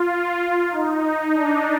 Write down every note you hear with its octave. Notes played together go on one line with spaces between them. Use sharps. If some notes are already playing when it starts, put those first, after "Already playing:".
Already playing: F4
D#4
D#4
D4